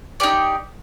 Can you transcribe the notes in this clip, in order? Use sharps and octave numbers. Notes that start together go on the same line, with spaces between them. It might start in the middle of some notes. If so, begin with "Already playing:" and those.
D#4 G4 D5